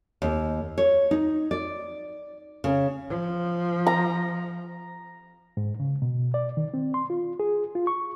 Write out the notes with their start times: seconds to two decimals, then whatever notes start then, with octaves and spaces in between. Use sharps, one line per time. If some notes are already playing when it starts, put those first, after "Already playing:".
0.22 D#2
0.78 C#5
1.11 D#4
1.51 D5
2.64 C#3
3.10 F3
3.87 A#5
5.57 G#2
5.80 C#3
6.02 B2
6.34 D5
6.57 D#3
6.74 C4
6.94 C6
7.10 F4
7.40 G#4
7.75 F4
7.87 C#6